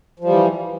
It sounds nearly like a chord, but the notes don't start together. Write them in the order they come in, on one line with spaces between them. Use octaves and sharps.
F3 G3 E3